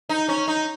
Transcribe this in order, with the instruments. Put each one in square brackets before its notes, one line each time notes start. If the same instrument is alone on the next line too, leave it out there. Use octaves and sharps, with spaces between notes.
[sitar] D#4
C#4
D#4